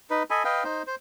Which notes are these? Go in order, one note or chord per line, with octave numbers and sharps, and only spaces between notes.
D#4 B4
A4 D#5 G#5 B5
B4 D#5 F5 G5
D#4 C5
C5